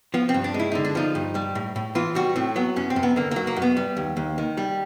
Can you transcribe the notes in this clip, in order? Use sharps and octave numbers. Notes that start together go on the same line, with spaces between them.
F3 B3
C4
G2
D4
G#3
E4
D3 D#4
D4
F3 D#4
G2
G3
A2
A2
E3 F4
G3 F#4
A2 C4
F#3 B3
F#2 C#4
C4
F#2
B3
D3 A#3
F#3 A#3
A#3
F#2
B3
G3
D#2
D#2
D#3
G3